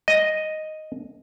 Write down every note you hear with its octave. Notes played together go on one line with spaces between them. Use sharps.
D#5